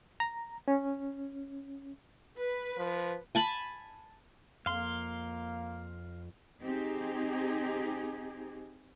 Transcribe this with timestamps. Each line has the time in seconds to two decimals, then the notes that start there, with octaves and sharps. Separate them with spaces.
0.20 A#5
0.68 C#4
2.38 B4
2.78 F3
3.35 G#5 A5 B5
4.66 F2 A#3 F5 C6
6.62 C4 D#4 G4 G#4